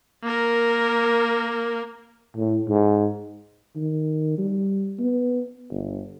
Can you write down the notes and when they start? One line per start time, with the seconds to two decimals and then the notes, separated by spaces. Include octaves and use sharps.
0.23 A#3 A#4
2.37 A2
2.68 G#2
3.76 D#3
4.38 G3
4.99 B3
5.71 G1